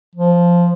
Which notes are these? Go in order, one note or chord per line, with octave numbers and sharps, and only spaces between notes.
F3